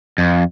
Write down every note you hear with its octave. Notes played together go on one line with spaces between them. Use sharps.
F2